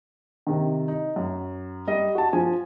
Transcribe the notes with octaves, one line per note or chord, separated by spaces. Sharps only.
C3 D#3
D#4
F#2
G3 D#5
F#4 A5
F3 G#5